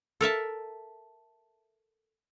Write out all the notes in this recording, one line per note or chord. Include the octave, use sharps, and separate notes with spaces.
A4 A#4 E5 A5